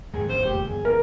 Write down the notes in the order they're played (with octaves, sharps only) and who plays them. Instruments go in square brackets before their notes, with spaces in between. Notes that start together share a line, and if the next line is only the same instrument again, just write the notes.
[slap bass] D#2 D#3 F#3 [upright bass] G#2 [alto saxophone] G#4
[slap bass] A#1 D#2 A#2 [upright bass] D4 [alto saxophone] C5
[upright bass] F1 [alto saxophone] G4
[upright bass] G1 [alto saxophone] G#4
[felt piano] A#4